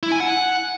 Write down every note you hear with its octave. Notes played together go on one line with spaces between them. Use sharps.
E4
G#5
F#5